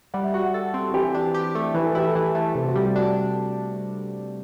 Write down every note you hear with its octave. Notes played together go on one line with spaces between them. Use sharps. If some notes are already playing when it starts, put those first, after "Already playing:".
G3 F#5
E5
F#4 F#5
A4
C4
F#4
E3 G4
D4
G4
A3
E3 B4
A4
E4 G4
A4
E3
A3
C3 A4
F#4
G3 G4
D4 F#4